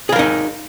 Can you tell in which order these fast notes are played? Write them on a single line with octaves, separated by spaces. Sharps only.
G#4 F5 A#4 D#4